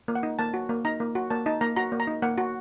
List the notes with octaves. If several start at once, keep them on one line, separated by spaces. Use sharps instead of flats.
A#3
F#5
D#4
A#3 A5
F#4
A#3
D#4 A#5
A#3
F#4
A#3 A5
D#4 A5
A#3 A#5
F#4 A#5
A#3
A#5
D#4
A#3 F#5
F#4